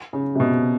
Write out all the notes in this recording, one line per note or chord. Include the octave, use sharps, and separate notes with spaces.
C#3
C3
B2